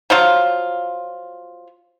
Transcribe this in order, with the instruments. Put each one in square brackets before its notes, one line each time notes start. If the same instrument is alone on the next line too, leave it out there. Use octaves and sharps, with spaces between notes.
[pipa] F3 F#3 F4